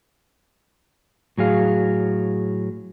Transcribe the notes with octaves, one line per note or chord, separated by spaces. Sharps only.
A2 F#3 G#4 F5